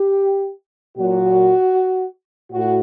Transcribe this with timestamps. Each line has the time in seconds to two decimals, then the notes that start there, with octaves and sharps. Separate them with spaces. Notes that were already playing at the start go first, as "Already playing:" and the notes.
Already playing: G4
0.97 A#2 F#3 F#4
2.52 A2 F#4